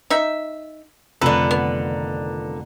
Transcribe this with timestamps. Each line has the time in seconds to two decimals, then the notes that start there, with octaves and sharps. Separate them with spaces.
0.10 D#4 E5
1.22 F1 F2 D3 D#3 A4 B4 A#5
1.51 B3